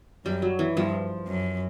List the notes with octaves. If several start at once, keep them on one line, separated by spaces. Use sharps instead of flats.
F#2 G3
F#3
E3
G2 F3
F#2